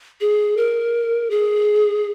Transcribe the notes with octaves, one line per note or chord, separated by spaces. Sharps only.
G#4
A#4
G#4